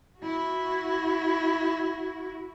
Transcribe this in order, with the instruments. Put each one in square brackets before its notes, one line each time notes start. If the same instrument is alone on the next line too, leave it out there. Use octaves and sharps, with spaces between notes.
[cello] E4 F#4